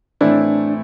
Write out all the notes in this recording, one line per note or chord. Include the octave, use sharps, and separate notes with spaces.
A2 E3 A3 C4 D4 E4